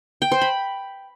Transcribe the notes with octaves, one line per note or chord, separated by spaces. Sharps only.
G5
C5
B5